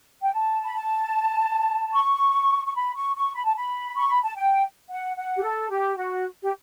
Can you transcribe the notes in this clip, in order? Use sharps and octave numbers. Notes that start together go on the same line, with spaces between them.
G5
A5
B5
A5
C#6
C#6
B5
C#6
C#6
B5
A5
B5
C#6
B5
A5
G5
F#5
F#5
G4
A4
G4
F#4
G4